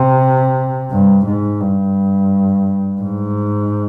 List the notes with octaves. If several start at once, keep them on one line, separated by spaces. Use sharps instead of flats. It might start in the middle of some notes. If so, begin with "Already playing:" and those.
Already playing: C3
G2
G#2
G2
G#2